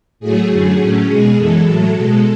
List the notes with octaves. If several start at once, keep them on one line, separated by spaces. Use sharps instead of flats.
A2 F#3 A3 G#4
F#2 D3 F#3 A3 G#4
A2 F#3 A3 C#4
B2 G#3 G#4
F#2 E3 G#3 A4
A2 F#3 A3
B2 G#3 A4